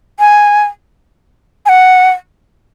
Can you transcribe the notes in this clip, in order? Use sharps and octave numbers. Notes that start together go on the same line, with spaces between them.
G#5
G#5
F#5